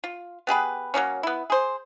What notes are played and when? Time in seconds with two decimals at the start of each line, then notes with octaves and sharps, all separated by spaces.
0.04 F4
0.47 B3 G4 G#4 B4
0.94 F#3 G3 A#3 C#4
1.23 B3 E4
1.50 G#4 C5